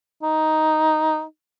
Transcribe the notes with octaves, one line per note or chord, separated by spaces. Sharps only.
D#4